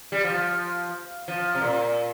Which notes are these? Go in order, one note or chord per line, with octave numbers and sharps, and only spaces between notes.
G3
F3
F3
C3
A#2